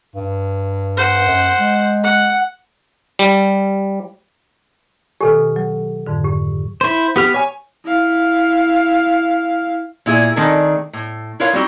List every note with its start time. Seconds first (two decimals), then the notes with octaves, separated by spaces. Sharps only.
0.15 G2
0.97 C5 F#5
1.27 F#2
1.60 G#3
2.03 F#5
3.19 G3
5.21 B2 D#3 G4 A4 B4 G#5
5.56 F#3
6.07 F2 G#2 D3
6.24 G4
6.81 E4 C5
7.16 B3 G4 F6
7.34 C#5 G#5
7.84 E4 F5
10.06 A#2 E4 G#4 E5
10.36 D#3 A3 C4 D4 G#4 A#4
10.93 A2
11.40 E4 F4 A#4 B4 C#5 F5
11.53 G3 C4 D#4 E4 F#4 G4